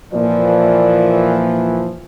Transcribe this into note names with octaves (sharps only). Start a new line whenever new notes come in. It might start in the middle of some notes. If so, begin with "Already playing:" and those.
A#2 E3 F3 D5